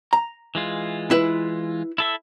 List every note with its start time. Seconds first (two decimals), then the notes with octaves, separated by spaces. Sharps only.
0.13 A#5
0.55 E3 G#3 F4
1.11 E4 B4
1.98 E4 A4 E5